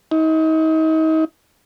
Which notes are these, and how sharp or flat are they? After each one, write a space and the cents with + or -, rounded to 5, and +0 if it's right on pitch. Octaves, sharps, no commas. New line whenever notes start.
D#4 +35